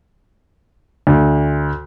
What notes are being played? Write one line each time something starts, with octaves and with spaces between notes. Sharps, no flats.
D2